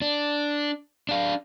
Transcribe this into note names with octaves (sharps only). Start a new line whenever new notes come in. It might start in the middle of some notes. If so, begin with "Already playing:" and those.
D4
D4 F5